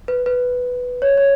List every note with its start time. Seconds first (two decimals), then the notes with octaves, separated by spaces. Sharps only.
0.08 B4
0.26 B4
1.02 C#5
1.17 C#5